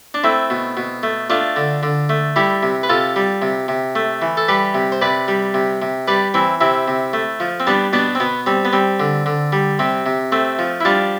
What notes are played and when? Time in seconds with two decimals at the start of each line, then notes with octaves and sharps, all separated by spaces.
0.14 D4
0.24 A3 C4 E4
0.50 B2
0.77 B2
1.03 A3
1.30 A3 D4 F4
1.56 D3
1.83 D3
2.09 A3
2.36 G3 E4 G4
2.63 C3
2.83 B4
2.89 C3 F4 A4
3.16 G3
3.42 C3
3.68 C3
3.95 A3
4.22 E3
4.37 A4
4.48 G3 G4 B4
4.74 C3
4.92 C5
5.01 C3 B4 D5
5.28 G3
5.54 C3
5.82 C3
6.08 G3 B4 D5
6.34 E3 C4 E4
6.61 C3 C4 E4
6.88 C3
7.13 A3
7.40 F3
7.60 C4
7.67 G3 B3 D4
7.93 B2 B3 D4
8.15 C4
8.20 B2 B3
8.46 G3 C4
8.65 B3
8.73 G3 C4
9.00 D3
9.26 D3
9.52 G3
9.79 C3 C4
10.06 C3
10.32 A3 C4
10.59 F3
10.81 E4
10.85 G3 D4 F4